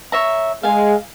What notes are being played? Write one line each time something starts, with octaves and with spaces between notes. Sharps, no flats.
C#5 E5 A#5
G#3 F5 G#5